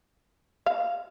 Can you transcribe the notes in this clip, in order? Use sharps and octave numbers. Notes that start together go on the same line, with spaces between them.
F5